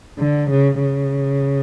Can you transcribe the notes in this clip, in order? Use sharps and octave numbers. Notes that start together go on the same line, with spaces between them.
D3
C#3
C#3